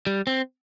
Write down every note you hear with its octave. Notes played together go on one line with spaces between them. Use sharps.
G3
C4